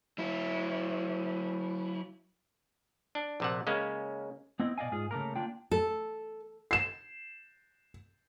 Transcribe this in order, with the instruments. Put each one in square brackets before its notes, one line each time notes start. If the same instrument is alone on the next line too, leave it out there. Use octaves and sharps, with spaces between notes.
[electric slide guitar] F#3 E4
[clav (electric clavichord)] D4
A#1 C3 F#5
C#3 G#3 A#3 C#4
[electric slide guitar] B3 C4 E4 D#5
B2 D5 D#5 F5 G#5
G#2 F4 G#4
C#3 A3 A#3 A#4
A#3 D4 F4 G5
[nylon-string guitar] A4
[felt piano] C7 E7